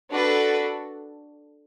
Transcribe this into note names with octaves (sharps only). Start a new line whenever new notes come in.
D4 F#4 A4 B4